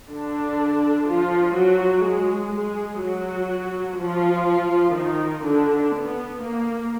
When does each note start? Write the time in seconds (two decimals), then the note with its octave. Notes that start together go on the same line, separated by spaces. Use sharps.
0.09 D3 D4
1.07 F3 F4
1.55 F#3 F#4
2.04 G#3 G#4
2.53 G#3 G#4
3.02 F#3 F#4
3.99 F3 F4
4.96 D#3 D#4
5.45 D3 D4
5.94 B3
6.43 A#3